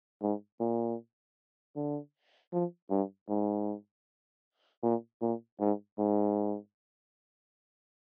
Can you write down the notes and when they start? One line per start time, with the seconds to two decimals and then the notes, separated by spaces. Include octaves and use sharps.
0.22 G#2
0.60 A#2
1.76 D3
2.53 F3
2.90 G2
3.29 G#2
4.83 A#2
5.22 A#2
5.60 G#2
5.98 G#2